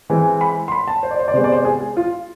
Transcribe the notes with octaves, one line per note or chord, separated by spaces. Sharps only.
E3 G#3 C4
B5
C6
B5
A5
C5
D5
C5
D5
C3 G#3 B3 C5
D5
C5
G#4
G#4
F4